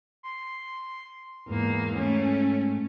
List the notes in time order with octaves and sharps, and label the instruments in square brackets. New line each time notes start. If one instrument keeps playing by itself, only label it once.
[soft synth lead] C6
[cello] E2 A#3 [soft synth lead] G#2
[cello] A3 C#4